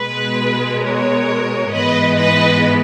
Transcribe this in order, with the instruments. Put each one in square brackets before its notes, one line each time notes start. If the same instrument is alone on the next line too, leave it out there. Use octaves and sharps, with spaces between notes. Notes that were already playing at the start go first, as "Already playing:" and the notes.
Already playing: [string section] B2 G#3 B3 B4
A#4 C#5
G#2 E3 G#3 B3 B4 D#5
B4 D#5